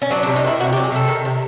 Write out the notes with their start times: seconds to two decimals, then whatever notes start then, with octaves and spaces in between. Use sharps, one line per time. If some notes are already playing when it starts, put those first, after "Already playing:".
0.02 C#4
0.10 F#3 D4
0.23 D4
0.27 C3
0.36 D#4
0.44 D#3 E4
0.60 C3 F#4
0.73 G4
0.76 F#3
0.84 G#4
0.92 C3 A4
1.08 D#3
1.25 C3